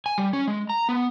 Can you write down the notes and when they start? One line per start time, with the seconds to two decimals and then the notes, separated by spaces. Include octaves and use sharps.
0.06 G#5
0.18 G3
0.33 C#4
0.47 G#3
0.70 A#5
0.89 B3